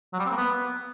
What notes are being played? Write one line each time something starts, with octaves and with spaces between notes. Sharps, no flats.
F#3
G3
C4
A#3
B3